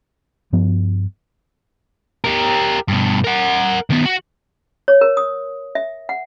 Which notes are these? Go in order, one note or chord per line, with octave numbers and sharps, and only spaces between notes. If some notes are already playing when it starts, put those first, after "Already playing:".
G2 F3 B3
G4 A#4
G2 B2
A#4 F#5
D#3 B3
F#4
C#5
A#4
D#6
E5
F#5